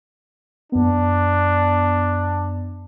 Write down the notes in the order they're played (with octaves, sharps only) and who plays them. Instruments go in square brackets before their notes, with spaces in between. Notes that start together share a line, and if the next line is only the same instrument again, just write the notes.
[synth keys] F#2 B3 [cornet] D4